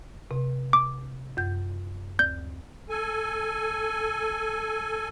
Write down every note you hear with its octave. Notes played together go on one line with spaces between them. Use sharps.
C3
D6
F#2 G6
D2 G6
A4 G#5